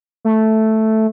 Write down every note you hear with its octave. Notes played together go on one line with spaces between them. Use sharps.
A3